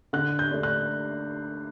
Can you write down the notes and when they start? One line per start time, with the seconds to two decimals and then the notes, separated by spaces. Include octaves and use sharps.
0.13 D3 F#6
0.39 G6
0.51 A3 D4
0.63 F#6